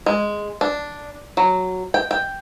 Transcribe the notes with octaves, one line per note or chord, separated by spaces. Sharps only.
G#3
D4
F#3
G5
G5